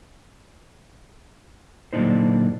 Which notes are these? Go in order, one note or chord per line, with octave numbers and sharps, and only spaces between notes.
F#2 A#2 D3 D4 D#4 C5